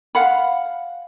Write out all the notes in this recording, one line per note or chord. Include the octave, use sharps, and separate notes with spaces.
F5 F#5 B5